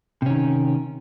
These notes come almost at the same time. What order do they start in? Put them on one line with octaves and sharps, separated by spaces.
C3 C#4 D#3